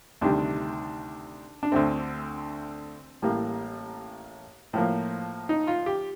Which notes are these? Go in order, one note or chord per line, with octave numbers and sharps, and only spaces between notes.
D2 C3 D#3 G3 D4
D4
D2 D3 A3 C4
A1 A2 G3 A#3
A2 F3 A#3
D#4
F4
G4